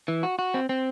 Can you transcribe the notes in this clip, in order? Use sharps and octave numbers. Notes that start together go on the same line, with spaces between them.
E3
F#4
F#4
C4
C4